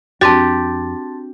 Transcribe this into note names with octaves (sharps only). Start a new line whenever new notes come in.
F2 C4 D4 F#4 G4 A5 C6 A6